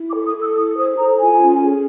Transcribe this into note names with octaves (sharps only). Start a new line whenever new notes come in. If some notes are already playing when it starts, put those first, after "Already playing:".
Already playing: E4
D6
A4
D#6
A4
E6
E4 D#6
C5 D#6
A4 A#5
F4 G#5
C#4
G#4